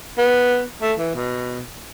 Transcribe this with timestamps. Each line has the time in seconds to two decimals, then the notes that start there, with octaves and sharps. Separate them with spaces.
0.18 B3
0.82 A3
0.99 E3
1.15 B2